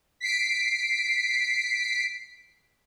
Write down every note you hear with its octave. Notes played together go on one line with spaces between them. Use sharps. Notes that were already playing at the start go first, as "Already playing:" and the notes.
B6 C7 D7